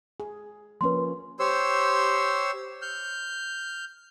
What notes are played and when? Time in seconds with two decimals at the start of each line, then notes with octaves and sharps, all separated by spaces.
0.20 G#4
0.81 F3 A#3 C#4 B4 C6
1.40 G4 C5 C#5 C6 E6
2.82 F6 G6